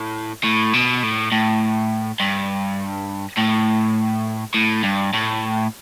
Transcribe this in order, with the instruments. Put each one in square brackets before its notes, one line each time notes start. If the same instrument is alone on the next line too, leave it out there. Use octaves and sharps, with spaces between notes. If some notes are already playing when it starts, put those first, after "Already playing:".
Already playing: [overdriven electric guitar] A2
A2
B2
A2
A2
G2
A2
A2
G2
A2